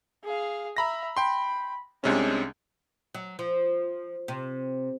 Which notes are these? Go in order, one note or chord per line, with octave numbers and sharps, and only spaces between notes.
G#4 F5
E5 A#5 B5 A#6
G5 B5 C6
C2 C3 G#3 C#4 D4
F#3
F3
C3